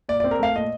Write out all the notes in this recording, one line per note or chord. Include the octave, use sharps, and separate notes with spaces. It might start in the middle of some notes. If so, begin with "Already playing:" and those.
A#2 D5
C4 D5
A#4
A3 F5
A#2 D#5